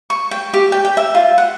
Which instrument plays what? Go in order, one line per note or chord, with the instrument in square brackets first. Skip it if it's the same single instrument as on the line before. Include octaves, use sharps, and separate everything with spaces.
[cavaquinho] C#6
G5
G4
G5
G5
E5
F4
F#5